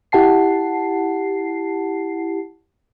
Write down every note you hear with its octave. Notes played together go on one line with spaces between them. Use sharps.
E4 G4 F#5 A5 C7